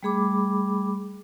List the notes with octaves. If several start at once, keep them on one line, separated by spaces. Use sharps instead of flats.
G3 A3 G#4 B5 D6